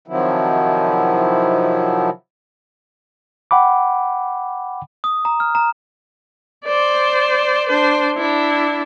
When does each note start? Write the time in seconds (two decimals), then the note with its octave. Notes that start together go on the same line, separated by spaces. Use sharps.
0.08 C3 D#3 F3 F#3 E4
3.51 F#5 G5 B5 D6
5.04 D#6
5.25 A#5
5.40 F6
5.55 A#5
6.65 C5 D5
7.69 D4 C5
8.17 D4 E4